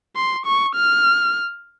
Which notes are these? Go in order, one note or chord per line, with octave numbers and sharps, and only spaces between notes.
C6
C#6
F6